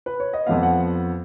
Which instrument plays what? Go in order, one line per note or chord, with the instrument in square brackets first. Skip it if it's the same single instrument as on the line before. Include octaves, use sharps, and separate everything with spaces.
[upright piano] B4
C#5
D#5
F2 F3 B3 F5
F#5